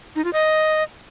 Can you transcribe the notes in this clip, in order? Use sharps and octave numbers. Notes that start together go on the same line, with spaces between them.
D#4
F4
D#5